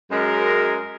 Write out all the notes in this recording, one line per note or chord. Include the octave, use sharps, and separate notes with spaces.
F#2 G#3 A#4